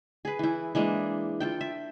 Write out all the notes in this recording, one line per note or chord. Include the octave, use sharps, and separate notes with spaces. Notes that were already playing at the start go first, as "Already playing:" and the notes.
G#4 B4
E3 E4
E3 G#3 A#3 D4
F4 A4 G5
E5